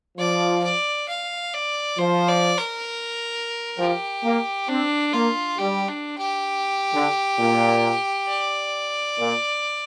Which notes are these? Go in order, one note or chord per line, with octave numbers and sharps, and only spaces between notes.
F3 D5
D5
F5
D5
F3 C5
D5
A#4
F3 G4
A#3
C4 D4
A#3 F4
G3 G4
D4
G4
D3
A#2
D5
A#2